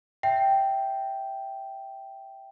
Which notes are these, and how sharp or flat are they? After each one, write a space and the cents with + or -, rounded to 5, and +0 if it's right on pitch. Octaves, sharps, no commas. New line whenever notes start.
E5 +0 G5 -5